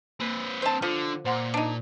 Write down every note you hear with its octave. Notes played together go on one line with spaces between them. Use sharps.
A#3 C4 B4
C5 A5
D3 F3 F4
A#2 C5 F#5 C6
D4 D#4